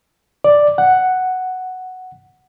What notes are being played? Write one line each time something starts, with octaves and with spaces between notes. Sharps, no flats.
D5
F#5